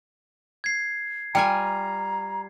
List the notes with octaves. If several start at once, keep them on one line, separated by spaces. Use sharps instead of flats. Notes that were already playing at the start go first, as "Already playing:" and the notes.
G#6 C7
G3 F4 G5 G#5 A#5